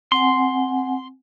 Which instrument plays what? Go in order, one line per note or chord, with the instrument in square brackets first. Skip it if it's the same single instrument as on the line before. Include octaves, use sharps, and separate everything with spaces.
[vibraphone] C4 F#5 G#5 [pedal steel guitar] C6